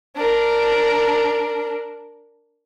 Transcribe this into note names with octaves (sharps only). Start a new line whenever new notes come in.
D4 A#4